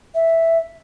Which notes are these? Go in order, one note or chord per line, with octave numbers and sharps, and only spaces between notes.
E5